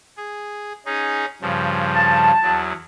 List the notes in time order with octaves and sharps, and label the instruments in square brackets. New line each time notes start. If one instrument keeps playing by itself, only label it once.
[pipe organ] G#4
C#4 D#4 G#4
G2 C#3 F3
[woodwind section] A5
[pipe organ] E2 F#3